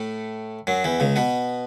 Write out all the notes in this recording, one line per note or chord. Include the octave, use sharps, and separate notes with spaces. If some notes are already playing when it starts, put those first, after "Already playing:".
Already playing: A2 A3
F#2 F#3
E2 E3
C#2 C#3
B2 B3